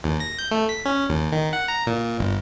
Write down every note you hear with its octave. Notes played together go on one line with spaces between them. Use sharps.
D#2
A#6
G6
A3
B6
C#4
D#2
D#3
F#5
A#5
A#2
G1